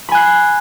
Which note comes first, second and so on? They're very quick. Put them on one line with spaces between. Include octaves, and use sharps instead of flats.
B5 G#5 F#6 C7